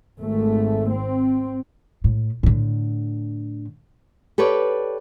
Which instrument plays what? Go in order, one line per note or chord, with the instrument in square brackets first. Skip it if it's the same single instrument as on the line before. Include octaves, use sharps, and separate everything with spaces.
[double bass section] G#1 A3
C4
[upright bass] A2
A2 D3
[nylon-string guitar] G4 A4 B4 C#5 D5